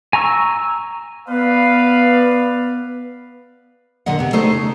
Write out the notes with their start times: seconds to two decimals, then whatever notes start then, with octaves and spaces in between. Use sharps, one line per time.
0.13 G#5 A#5 C#6 E6
1.28 B3 B4 D5 F5
4.06 A#2 D3 D#3 D#5 F#5
4.19 C3 B3
4.33 A3 D#4 A4 C5 D#5
4.52 C#3